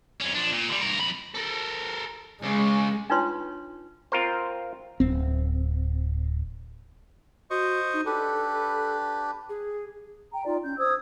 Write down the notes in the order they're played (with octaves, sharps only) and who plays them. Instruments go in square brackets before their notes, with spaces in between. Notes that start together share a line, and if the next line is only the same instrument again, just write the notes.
[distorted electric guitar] F2 C#4
F3 D4
A#2
D3 G3
G2 A#4
F2 B5
A4 A#4
[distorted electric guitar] C#2 C#3 [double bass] G#3
[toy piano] D4 D#4 F4 B4 C#5 C6
[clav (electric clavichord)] C4 F4 A#4 C5
[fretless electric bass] D1 C4
[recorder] F#4 [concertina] C5 D#5 C#6
[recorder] D#4
[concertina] D4 G4 B4 [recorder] A4
[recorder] G#4
[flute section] G5 A#5
D#4 F4 D5
C#4 G6
C5 D#6 E6 G#6